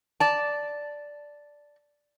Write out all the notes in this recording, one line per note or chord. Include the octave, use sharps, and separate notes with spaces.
D5 A5